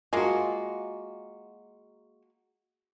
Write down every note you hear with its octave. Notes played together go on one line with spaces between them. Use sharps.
G#3 A#3 F4 F#4